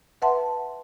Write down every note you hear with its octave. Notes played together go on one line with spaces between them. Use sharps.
B4 E5 F#5 A5 C6